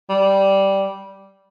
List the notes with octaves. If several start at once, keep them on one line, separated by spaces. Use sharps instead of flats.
G3